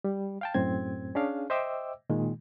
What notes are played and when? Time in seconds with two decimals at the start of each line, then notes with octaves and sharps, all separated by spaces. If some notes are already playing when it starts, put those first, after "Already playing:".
0.04 G3
0.41 F5 G5 A5
0.54 F#2 A2 C4 G#6
1.15 C#4 D4 G#4 F5
1.50 C5 D#5 E5 G5 D6 E6
2.10 A#2 D#3 G#3